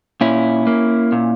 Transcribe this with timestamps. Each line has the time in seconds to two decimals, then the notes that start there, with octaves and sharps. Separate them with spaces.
0.21 A#2 C#4 E4
0.67 A#3
1.12 A#2